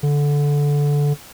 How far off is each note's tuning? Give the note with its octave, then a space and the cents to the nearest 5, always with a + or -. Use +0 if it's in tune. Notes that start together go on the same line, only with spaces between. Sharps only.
D3 -15